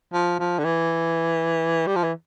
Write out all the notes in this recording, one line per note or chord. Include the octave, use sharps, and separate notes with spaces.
F3
F3
D3
E3
G3
F3
E3